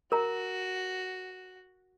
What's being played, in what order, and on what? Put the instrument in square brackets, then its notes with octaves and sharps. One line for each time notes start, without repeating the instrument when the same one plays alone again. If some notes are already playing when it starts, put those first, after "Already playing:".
[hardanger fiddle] F#4 [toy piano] A#4 A#5